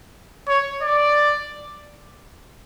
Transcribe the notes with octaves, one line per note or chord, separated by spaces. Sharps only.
C#5
D5